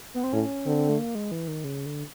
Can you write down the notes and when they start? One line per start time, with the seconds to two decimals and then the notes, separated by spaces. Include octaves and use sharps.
0.14 B3
0.24 C4
0.33 A2 C#4
0.66 D3 C4
0.89 A3
0.98 A#3
1.15 G#3
1.31 E3
1.48 D#3
1.64 C#3
1.86 D3